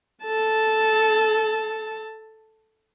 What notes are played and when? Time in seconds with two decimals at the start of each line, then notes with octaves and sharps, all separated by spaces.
0.24 A4 A5